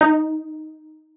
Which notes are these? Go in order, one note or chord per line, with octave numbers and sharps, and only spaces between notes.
D#4